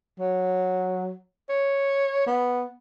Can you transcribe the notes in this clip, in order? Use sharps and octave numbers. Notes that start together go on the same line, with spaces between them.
F#3
C#5
B3